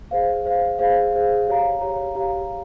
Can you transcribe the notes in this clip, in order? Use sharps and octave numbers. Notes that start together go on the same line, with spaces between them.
G#4 C5 F5
G#4 C5 F5
G#4 C5 F5
G#4 C5 F5
G4 C#5 F5 A#5
G4 C#5 F5 A#5
G4 C#5 F5 A#5